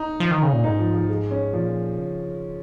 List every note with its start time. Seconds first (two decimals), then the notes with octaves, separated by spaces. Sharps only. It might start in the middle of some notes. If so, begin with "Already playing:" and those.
Already playing: D#4
0.20 F3
0.31 D#3
0.42 C#3
0.53 A#2
0.64 G#2 D#4
0.79 F3
0.94 F3
1.09 G#3
1.31 C#4
1.53 A#2 F3
1.98 C#3